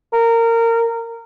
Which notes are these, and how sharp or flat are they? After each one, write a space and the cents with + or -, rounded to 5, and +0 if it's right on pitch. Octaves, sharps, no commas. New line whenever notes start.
A#4 -20